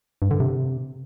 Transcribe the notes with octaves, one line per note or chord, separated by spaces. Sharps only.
G2
D3
C3